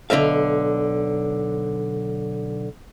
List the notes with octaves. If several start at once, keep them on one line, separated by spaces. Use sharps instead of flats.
B1 D3 D#3 E5 F5